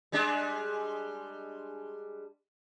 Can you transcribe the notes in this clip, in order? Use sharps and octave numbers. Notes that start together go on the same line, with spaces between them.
G3 G#3 D4